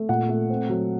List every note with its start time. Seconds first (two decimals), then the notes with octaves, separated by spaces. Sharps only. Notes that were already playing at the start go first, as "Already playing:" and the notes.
Already playing: A3
0.09 A#2 F#5
0.29 A3
0.50 C4
0.69 F#3